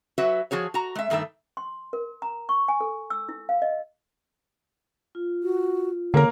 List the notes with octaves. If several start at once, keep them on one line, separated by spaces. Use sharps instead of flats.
F#3 F#4 B4 E5
F3 F#4 G#4 C#5
F#4 A#5
G#3 E5
G2 D#3 A3 F#4 E5
C6
A#4
A#5
C#6
G#5
A4
E6
E4
F5
D#5
F4
F#4
D3 A#3 A#4 C#5